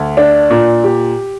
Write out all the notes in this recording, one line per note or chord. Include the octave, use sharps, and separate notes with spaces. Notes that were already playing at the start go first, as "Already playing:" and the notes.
Already playing: D2
D4
A#2
G4